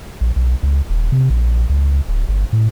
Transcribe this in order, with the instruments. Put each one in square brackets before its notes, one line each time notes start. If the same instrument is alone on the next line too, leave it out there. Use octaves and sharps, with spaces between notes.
[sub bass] A#1
B1
C#2
D#1
C3
A#1
C#2
D1
G1
A2